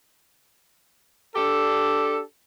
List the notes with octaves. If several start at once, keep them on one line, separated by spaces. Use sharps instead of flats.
D4 G4 A4